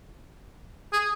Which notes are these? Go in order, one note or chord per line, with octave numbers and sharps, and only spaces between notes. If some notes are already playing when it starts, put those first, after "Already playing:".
G#4